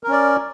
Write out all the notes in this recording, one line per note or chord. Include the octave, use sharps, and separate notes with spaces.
C#4 A#4 D5